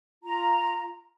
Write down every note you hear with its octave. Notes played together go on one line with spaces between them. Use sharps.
F4 A#5